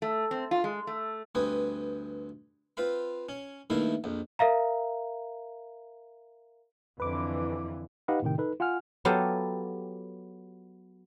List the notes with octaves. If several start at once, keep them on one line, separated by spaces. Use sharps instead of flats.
A3
C4
F4
G#3
A3
D2 G2 C4 B4 G#5 D#6
C4 F4 B4 F5 B5
C#4
G2 D#3 A3 A#3 E4 F5
A#1 F2
A#4 E5 F5 A#5
F2 D3 E3 B4 D6
D#4 G4 B4 D#5 F5 F#5
A2 C3 D#3 G5
D#4 A4 B4
F4 F#5 G#5 F6
F#3 B3 F4 G4 A4 F5